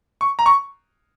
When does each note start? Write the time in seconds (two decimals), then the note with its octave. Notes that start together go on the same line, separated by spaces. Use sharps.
0.21 C#6
0.39 A#5
0.46 C#6